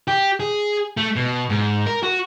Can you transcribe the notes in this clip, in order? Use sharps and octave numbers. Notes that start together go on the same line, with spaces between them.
G4
G#4
A3
B2
G#2
A#4
F#4